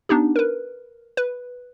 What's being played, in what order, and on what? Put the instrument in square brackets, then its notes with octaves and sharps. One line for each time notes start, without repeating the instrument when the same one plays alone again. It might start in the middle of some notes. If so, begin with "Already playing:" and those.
[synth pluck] B3 D4 D#4 G4
A#4 B4
B4